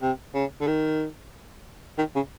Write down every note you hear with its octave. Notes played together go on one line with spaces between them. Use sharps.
C3
C#3
D3
D#3
D#3
C#3